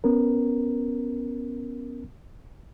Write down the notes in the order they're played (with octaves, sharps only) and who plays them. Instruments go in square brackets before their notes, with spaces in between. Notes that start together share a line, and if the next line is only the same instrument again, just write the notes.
[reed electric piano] B3 C#4 A#4